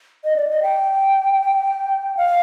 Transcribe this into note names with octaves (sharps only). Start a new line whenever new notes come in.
D#5
D5
D#5
G5
F5